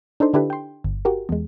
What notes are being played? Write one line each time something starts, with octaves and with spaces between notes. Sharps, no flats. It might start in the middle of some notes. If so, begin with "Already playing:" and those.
D4 D#4 A4 C5
D3 D4 E4 G4 A4 B4
G5 C6
G1
F#4 G4 A#4
E2 G#3